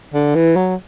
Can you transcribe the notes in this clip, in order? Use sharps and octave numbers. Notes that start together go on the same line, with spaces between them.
D3
E3
F#3